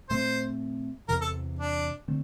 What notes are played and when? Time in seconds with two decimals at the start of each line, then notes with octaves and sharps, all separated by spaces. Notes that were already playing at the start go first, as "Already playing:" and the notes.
0.09 A#2 A3 C4 C5
1.08 E2 C3 E3 A#4
1.21 A4
1.59 D4
2.08 D3 A3 C4